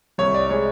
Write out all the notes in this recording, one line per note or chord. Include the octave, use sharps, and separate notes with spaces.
C2 C#5
D5
G#3 C#5